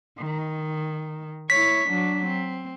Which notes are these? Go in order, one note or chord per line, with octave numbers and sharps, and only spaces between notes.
D#3
E4 C#5 B6
F#3 D4
C4